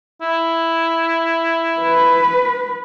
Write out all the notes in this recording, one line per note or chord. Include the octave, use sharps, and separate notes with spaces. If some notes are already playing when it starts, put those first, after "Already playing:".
E4
B4